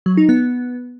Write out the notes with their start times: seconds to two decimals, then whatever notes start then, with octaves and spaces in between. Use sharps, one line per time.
0.06 F#3
0.17 D#4
0.29 B3